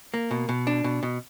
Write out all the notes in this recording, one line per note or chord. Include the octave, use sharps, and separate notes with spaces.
A#3
B2
B2
D4
B2
B2